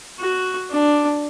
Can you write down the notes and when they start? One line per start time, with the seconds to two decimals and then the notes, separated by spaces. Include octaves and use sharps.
0.20 F#4
0.70 D4